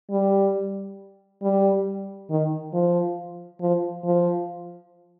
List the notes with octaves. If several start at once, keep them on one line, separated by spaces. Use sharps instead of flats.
G3
G3
D#3
F3
F3
F3